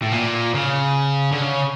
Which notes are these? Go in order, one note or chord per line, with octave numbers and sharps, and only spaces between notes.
A2
A#2
C#3
D3
C#3